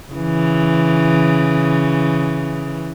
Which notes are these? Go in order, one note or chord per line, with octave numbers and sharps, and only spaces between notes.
C#3 E3